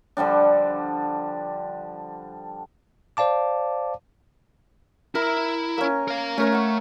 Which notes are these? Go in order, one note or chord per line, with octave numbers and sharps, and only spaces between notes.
D3 F3 G3 D4
C5 D5 F5 A5 D6
E4 A#4
A#3 C#4
A#4 F5
A3 C#4 A#4 C#5
F#5 C#6